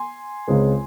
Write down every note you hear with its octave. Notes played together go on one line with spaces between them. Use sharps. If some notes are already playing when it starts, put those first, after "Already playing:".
Already playing: G#5 C6
C#2 C#3 G#3 C4